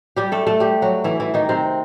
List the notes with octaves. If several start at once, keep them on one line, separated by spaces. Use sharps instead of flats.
G3 G4
A3 A4
A3 A4
G3 G4
F#3 F#4
E3 E4
E3 E4
D#3 D#4
C3 C4